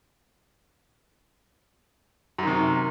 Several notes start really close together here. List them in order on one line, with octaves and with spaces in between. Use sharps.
F#2 D#3 C3